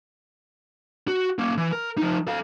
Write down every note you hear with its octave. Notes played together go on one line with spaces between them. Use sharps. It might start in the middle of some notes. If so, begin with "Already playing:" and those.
F#4
A#3 C#4
E3
A#4
F3 D#4
A4 F5